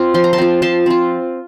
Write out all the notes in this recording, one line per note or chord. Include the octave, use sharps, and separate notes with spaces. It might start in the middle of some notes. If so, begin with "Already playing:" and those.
Already playing: C4 F4
F3 C6
A#5
A5 C6
C4 F4
F3 A5 C6
C4 F4